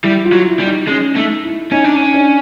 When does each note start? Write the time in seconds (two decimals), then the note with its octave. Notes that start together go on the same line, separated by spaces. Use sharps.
0.03 G3 E4
0.25 F4
0.32 F#3
0.46 E4
0.59 G3
0.66 D#4
0.88 G#3 C#4
1.16 A3 D#4
1.44 E4
1.72 C#4 D#4
1.84 D4
1.96 C#4
2.14 D4